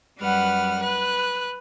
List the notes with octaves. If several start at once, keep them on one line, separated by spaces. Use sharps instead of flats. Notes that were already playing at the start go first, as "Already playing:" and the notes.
F#2 G3 B4 F#5 F6
B4 F#6